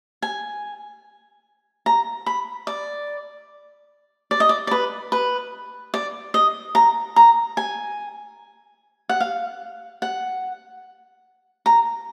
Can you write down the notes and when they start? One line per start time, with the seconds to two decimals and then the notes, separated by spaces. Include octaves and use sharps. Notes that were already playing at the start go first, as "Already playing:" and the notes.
0.22 G#5
1.86 A#5
2.26 B5
2.67 D5
4.31 D5
4.40 D#5
4.49 D5
4.67 D5
4.71 B4
5.12 B4
5.94 D5
6.34 D#5
6.75 A#5
7.16 A#5
7.57 G#5
9.09 F#5
9.20 F5
10.02 F#5
11.66 A#5